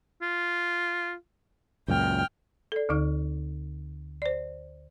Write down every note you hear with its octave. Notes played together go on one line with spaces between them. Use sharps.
F4
C#2 F#2 A#2 G5 F6
A4 D5
D2 D3 D#4 F6
C5 D5